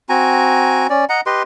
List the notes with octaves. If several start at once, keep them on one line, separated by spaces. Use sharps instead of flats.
C4 F#4 G#5 A#5
C#4 D5
D#5 F#5 A#5
G4 B4 D#5 C6